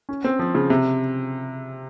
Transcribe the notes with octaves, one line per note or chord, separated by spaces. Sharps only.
C#4
C4
F3
C#3
C3